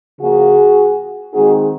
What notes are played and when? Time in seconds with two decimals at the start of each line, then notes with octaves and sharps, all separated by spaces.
0.20 C#3 F3 A#3 F#4 G#4
1.33 D#3 G#3 C4 D#4 F#4 G#4